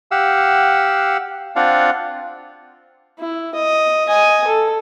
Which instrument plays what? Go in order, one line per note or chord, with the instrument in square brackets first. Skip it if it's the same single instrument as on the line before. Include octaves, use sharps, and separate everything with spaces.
[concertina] G4 F5 F#5 E6
C4 D4 F4 F5 F#5
[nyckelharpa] E4
D#5
D#5 G#5
A4